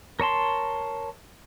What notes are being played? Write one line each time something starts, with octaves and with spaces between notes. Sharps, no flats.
A#4 C#5 A5 C6